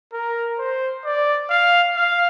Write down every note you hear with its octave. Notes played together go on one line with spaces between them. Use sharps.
A#4
C5
D5
F5
F5